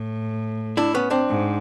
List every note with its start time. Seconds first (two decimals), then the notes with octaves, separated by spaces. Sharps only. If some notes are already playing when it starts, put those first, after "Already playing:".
Already playing: A2
0.77 D4 E4
0.94 B3 C#4
1.11 C4 D4
1.28 G#2